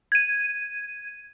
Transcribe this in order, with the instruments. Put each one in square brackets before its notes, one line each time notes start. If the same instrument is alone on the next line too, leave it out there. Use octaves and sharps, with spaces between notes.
[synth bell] G#6 D#7